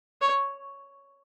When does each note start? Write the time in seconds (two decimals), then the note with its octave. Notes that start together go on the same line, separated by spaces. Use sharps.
0.22 C#5